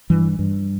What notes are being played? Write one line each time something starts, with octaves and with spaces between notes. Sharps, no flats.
G2 E3
G2